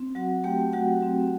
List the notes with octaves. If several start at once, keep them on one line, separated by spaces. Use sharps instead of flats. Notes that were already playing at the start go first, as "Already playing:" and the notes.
Already playing: C4
F#3 F#4 F#5
A3 G4 G5
F#3 F#4 F#5
C4